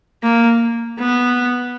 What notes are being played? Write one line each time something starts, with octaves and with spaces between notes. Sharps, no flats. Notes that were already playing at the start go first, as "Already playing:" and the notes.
A#3
B3